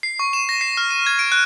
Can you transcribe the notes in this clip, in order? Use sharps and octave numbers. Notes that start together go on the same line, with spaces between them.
C7
C#6
E7
A#6
C7
F6
D#7
G#6
D7
F#6